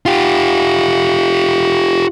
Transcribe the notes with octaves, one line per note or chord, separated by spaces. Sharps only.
F4 G4